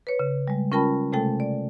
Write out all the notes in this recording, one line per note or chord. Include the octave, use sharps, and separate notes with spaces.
B4 C#5
C#3
G3 G#3
C#4 F4 A#4 G5 A5 B5
C3 G#3 A3 A4 G5
D5